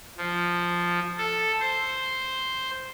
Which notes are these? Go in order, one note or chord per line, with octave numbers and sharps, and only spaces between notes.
F3
A4
C5